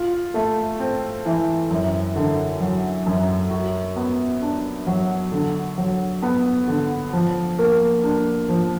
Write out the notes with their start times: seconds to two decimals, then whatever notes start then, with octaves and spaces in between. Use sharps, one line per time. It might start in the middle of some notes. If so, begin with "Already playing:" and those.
Already playing: F4
0.34 A3
0.79 C4
1.25 E3
1.71 F#2
2.16 D3
2.60 F#3
3.06 F#2
3.50 F#4
3.96 B3
4.42 D4
4.87 F#3
5.32 D3
5.78 F#3
6.22 B3
6.68 D3
7.13 F3
7.59 A#3
8.03 D4
8.49 F3